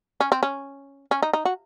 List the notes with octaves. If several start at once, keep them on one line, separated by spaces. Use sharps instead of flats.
C#4
C4
C#4
C#4
D#4
D#4
F#4